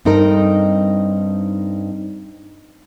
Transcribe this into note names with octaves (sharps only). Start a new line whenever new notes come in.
G2 C4 D#4 A4 A#4 D#5